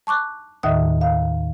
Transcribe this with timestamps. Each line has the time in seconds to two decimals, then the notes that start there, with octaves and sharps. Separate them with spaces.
0.07 A5 C#6 D6 F#6
0.63 D#2 A2 D#3 D#5 E5 D#6
1.01 F5